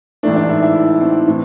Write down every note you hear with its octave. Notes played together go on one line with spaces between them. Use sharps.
A1 G#2 E3 A3 D4
D4
E4
E4
E4
C4
A2 E3